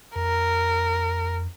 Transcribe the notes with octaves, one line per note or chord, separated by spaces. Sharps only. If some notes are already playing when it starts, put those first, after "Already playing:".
F2 A#4